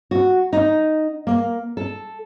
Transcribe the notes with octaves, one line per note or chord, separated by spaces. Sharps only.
F#4
D#4
A#3
A4